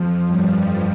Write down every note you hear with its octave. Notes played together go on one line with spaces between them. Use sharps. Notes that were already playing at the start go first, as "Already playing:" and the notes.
Already playing: F2 F3
G2 G3